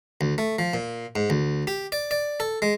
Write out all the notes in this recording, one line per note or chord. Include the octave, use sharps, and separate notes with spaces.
D2
A3
F3
A#2
G#2
D2
G4
D5
D5
A4
G#3